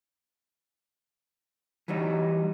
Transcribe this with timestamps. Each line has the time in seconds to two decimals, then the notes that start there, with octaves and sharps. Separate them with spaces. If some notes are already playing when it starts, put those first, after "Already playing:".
1.88 E3 F#3 G3 D#4